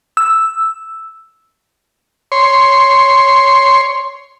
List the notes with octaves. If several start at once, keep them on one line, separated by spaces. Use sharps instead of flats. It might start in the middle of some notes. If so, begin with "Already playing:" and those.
E6
C#5 C6